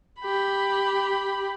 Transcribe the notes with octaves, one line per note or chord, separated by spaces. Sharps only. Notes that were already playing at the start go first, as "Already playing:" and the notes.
G4 B5